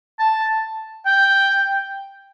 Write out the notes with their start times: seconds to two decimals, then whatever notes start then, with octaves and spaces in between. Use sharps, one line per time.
0.19 A5
1.06 G5